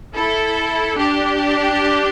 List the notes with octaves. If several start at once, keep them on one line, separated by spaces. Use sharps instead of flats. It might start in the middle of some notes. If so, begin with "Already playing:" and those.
E4 A4
D4 G4